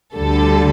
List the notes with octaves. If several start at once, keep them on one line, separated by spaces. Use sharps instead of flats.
D2 D3 G3 A4